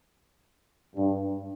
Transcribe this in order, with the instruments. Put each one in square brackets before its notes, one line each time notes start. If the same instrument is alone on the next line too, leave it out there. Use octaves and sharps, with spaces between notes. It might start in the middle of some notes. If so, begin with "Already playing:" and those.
[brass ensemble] G2